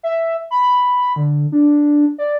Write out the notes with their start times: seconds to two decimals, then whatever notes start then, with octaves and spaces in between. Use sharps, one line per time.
0.03 E5
0.51 B5
1.16 D3
1.52 D4
2.18 D5